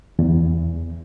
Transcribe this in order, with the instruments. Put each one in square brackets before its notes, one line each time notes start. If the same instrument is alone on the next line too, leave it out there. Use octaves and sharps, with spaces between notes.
[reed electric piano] E2